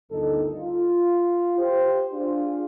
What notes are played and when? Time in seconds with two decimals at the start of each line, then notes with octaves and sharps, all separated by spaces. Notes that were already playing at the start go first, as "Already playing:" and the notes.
0.10 G1 D2 D#3 D#4 A4
0.57 F4
1.58 G4 C5
2.11 D4 F4 G#4